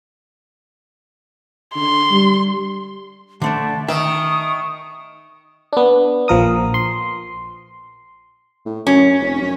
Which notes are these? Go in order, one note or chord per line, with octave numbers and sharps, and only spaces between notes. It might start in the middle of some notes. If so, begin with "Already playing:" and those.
D3 C6
G3
D3 A3 D4 E5 A5
D#3 E5 C#6 D#6
B3 D4
A#1 F3 A#4 D#6
C6
A2
F#2 C#4
F1
F#2